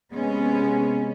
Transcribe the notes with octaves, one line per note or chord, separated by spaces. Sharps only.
C3 G#3 B3 C#4